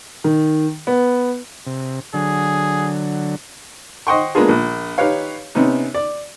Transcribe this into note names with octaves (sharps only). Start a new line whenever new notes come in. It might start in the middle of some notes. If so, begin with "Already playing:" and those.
D#3
B3
C3
D3 F#3 G#4
C5 D#5 F#5 G5 C6 C#6
G#3 A#3 B3 D4 F4 G#4
A#1
D#4 G4 B4 C#5 F5
C3 B3 C#4 D#4
D5